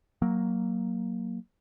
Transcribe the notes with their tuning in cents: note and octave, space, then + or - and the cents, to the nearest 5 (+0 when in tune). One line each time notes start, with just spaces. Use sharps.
F#3 +5 A#3 +0